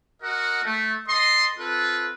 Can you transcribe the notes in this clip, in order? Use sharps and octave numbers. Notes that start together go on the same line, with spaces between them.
F#4 A#4 D#5 F#5
A3
A4 D#5 C6
C4 F4 A4 B4